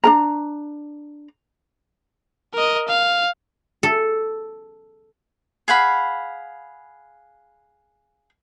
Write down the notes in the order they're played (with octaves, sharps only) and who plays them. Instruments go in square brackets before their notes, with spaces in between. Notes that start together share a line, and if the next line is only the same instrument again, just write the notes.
[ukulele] D4 A#4 A#5
[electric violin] A#4 D#5
F5
[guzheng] A4
[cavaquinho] G#4 F5 F#5 B5